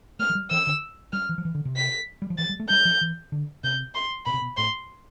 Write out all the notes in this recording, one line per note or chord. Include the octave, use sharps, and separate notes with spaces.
A3 F6
F3
G3
E3 E6
D3
G3 F6
E3
F3
E3
D3
C3
B6
G3
F3
E3 A6
G3
A3
G3 G6
F3
E3
D3
C3 G6
C6
B2 B5
C3
B2
A2 C6